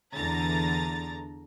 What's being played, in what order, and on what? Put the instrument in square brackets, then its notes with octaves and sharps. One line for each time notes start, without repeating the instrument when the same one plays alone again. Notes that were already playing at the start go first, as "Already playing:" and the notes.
[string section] E2 D3 E3 A#5 A6